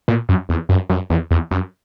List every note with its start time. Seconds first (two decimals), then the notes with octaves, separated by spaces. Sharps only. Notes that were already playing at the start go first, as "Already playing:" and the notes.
0.08 A#2
0.29 F#2
0.49 E2
0.69 F#2
0.90 F#2
1.10 E2
1.31 E2
1.51 F#2